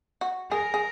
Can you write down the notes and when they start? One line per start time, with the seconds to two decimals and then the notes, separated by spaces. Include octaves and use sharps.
0.21 F#4
0.51 G#4 A#4
0.74 G#4